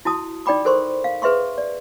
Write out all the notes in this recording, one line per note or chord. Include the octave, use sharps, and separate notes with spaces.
E4 F#4 A5 D#6
D#4 D5 G5 B5 D6
A4 A#4 C5 C6 C#6
F5
G#4 B4 E5 C6 C#6
D5